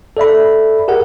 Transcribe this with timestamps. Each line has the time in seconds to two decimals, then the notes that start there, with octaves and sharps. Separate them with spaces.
0.17 A4 D5 E5 B5
0.88 G4 G#4 A#4 F#5